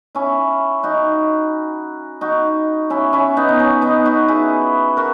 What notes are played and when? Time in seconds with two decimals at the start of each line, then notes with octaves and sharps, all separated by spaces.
0.15 C#4 E4
0.83 D#4 F#4
2.21 D#4 F#4
2.90 C#4 E4
3.13 C#4 E4
3.37 B3 D#4
3.49 D#4
3.60 C#4
3.82 B3 D#4
4.05 D#4 F#4
4.28 E4 G#4
4.97 F#4 A#4